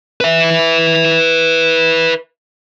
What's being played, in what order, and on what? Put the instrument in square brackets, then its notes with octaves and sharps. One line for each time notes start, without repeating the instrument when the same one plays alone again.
[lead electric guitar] B4 E5